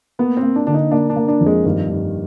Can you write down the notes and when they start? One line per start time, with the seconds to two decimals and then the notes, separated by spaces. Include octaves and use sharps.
0.19 A#3 B3
0.37 C4
0.43 A#3
0.56 D4
0.67 D3 D4
0.74 D#4
0.91 A#3 D4
1.10 D4
1.16 A#3
1.28 D4
1.41 F2
1.46 G#3
1.65 G2 D#3
1.89 G2